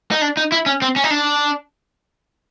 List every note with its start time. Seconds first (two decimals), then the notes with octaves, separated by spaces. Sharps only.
0.11 D#4
0.22 D4
0.37 D#4
0.52 E4
0.66 C#4
0.82 C4
0.96 C#4
1.04 D#4
1.11 D4